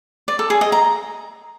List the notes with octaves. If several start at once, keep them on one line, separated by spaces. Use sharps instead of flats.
D5
A4
G#4
D#5
A#5